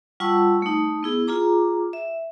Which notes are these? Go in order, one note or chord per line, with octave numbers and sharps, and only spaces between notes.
G3 F4 F#5 A5 C#6 E6
A3 D#4
B3 E4 G#4
F4 G#4 A#5 D6
E5